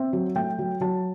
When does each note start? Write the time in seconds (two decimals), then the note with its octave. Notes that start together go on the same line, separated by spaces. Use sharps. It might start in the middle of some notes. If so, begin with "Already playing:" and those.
Already playing: C4 E5
0.13 F#3
0.36 A3 G5
0.59 F#3
0.81 F#3 A5